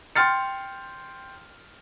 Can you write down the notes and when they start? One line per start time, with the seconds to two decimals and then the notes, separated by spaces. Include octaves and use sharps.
0.16 G5 C6 F6 A6 C#7